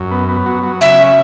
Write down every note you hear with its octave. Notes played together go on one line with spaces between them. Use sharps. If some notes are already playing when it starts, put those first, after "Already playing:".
Already playing: F#2
B3
B3
F#3
F#3
C#3 E5
C#4